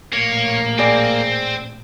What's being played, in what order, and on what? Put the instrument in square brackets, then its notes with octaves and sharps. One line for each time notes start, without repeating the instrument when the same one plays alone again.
[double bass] A#1 A2 [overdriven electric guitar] A#3 [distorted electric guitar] C#5
[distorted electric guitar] C4 [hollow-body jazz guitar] G#4 D5